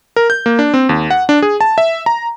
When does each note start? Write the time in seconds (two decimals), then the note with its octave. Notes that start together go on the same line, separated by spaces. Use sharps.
0.16 A#4
0.30 G6
0.46 A#3
0.59 D4
0.74 C4
0.89 D#2
1.11 F#5
1.29 D4
1.42 G#4
1.61 A5
1.78 E5
2.06 A#5